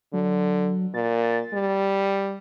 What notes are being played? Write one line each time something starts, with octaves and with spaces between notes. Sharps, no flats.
D3 F#3
A#2 A6
G3